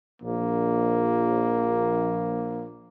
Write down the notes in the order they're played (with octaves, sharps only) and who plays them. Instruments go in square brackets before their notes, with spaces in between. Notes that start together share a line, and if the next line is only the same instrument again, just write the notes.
[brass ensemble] A#1 [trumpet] A#3